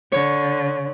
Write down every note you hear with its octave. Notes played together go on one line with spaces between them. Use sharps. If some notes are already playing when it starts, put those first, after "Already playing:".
D3 C#5